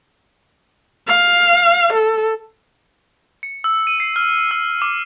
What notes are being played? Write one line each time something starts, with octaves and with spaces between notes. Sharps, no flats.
F5
A4
C#7
E6
D#7
C7
F6
E6
D6